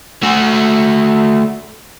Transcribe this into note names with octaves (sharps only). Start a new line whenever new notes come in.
A3 F#4